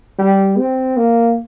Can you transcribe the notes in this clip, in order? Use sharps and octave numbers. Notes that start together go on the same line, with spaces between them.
G3
C4
A#3